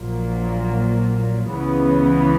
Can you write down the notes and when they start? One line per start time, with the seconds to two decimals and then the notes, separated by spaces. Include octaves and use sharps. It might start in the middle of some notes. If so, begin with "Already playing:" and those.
Already playing: A#1 A#2 F#3 A#3
1.46 C#2 C#3 E3 B3